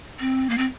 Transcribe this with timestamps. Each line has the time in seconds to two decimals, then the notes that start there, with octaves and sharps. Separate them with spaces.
0.20 C4
0.50 A#3
0.58 C4